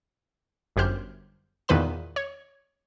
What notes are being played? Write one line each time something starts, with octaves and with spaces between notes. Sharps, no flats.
G1 F#2 G4 C5 F6 G6
E2 A#2 D#3 B4 B5 E7
C#5